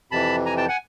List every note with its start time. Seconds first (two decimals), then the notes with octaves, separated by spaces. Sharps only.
0.11 F2 C3 E3 A5 B5
0.46 G#5 A#5
0.57 G5 A5
0.68 F#5 G#5